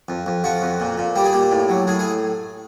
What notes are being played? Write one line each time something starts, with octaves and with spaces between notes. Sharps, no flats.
F2
F2
F3 F#4
F2
A#2
A#2
G3 G4
G#4
A#2 G4
A2
F#3
A2 G#4
G#4